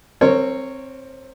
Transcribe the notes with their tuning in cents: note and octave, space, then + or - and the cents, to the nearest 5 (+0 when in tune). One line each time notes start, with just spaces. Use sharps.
C4 +15 A#4 -20 C#5 +0